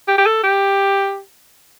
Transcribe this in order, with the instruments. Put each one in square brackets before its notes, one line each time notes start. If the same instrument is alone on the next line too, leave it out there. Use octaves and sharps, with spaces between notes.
[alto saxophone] G4
G4
A4
G4